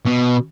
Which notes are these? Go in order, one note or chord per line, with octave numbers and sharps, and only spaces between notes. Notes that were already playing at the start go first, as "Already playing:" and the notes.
B2